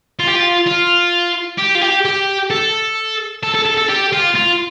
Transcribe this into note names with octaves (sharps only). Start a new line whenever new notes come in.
F4
G4
F4
F4
G4
F4
G4
G4
A4
A4
A4
A4
A4
G4
F4
F4